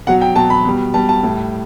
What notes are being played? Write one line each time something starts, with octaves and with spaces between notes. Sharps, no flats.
B2 F#3 F#5
G5
B2 F#3 A5
B5
B2 G3
B2 G3 A5
A5
A2 G3